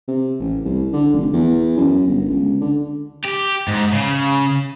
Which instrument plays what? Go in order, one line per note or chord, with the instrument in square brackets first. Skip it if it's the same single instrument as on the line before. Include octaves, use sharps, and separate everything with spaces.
[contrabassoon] C3
A1
C2
D3
F1
E2
F#2
G1
C#2
D3
[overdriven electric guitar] G4
G#2
C#3